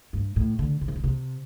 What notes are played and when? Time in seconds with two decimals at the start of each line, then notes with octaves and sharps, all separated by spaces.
0.13 G2
0.36 A2
0.59 D3
0.81 D3
0.88 D#3
0.96 D3
1.04 C3